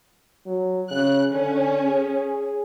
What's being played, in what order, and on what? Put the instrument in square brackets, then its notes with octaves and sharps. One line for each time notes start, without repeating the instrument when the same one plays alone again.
[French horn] F#3
[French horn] C#3 [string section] F#6
[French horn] D3 [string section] C#4
[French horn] G#4